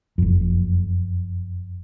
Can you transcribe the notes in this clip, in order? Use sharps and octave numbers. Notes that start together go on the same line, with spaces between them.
F#1 F2